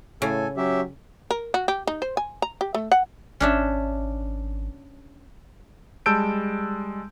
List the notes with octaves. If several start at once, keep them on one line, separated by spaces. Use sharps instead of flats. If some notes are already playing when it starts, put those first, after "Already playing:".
A2 C#3 A4 G#5
F#3 C#4 G4 E5
A#4
F#4
G4
D#4
C5
G#5
A#5
G4
A3
F#5
G#1 C#4 D4 E5
G3 G#3 A5 E6 G6 D7